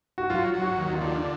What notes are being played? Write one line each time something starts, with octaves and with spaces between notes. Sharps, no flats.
F#4
F#3 F4
F#3
F#4
D#2
F4
D3